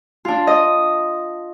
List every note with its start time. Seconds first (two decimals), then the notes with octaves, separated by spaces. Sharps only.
0.25 D4 F4
0.47 D#5